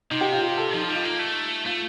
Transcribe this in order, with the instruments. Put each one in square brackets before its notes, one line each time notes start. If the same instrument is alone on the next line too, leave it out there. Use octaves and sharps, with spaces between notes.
[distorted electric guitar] C3 [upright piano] D#4
[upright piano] G4
F4
G4
A4
[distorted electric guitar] F3 [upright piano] D#4
[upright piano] D#4
[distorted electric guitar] G3
[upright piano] F4
[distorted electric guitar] A#3
A3
[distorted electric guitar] A3 [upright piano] F4